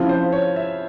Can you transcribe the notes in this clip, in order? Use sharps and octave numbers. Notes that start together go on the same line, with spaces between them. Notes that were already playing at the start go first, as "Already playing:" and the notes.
Already playing: C#3 F3 C4 E4 F4
C5
C#5
E5